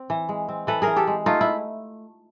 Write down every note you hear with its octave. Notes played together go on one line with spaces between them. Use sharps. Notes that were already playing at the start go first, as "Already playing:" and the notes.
Already playing: C4
E3
G#3
C4
E3 A4 B4
E3 G#4 A#4
G4 A4
G#3
A3 D#4 F4
E4